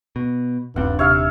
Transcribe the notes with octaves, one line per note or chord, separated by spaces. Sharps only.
B2
D#1 G2 C4 D4 F#5
C3 C#5 E5 F5